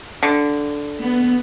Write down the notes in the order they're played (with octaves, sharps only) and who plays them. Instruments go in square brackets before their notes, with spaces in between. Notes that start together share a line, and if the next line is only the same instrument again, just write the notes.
[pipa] D3
[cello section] B3